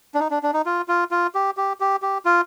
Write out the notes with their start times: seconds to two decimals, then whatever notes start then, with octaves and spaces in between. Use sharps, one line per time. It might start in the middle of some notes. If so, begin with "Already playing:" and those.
0.14 D4
0.20 D#4
0.31 D4
0.43 D4
0.54 D#4
0.66 F4
0.88 F4
1.11 F4
1.35 G4
1.57 G4
1.80 G4
2.02 G4
2.25 F4